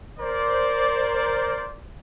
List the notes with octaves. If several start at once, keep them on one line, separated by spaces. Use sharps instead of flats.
A#4 C5 D5